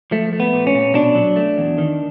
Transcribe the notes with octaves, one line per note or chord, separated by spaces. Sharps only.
F3 A3
A3
B3
A#2
C#4
A#2
B2 D4
F#3
A3
E2
D#3